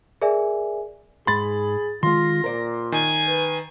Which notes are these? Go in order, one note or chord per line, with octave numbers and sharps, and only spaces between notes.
G#4 A#4 D5 E5 G#5
G#2 G#4 B5 C6 A6
D#3 G#3 F4 C6 A#6
A#2 A#4 C5 D5
D#3 G#5
B4